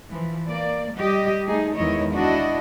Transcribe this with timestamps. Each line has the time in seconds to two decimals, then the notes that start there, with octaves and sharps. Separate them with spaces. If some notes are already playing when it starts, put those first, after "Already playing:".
0.11 E3 F3
0.48 A#3 D5
0.96 G3 G4 D#5
1.45 A3 D#4 G#4
1.76 E2 D#3 G#3 E4 C#5 D#5
2.13 D4 E4 F#4 D#5